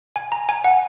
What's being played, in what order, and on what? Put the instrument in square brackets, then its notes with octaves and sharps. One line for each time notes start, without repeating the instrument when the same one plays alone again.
[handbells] G#5
A#5
G#5
F#5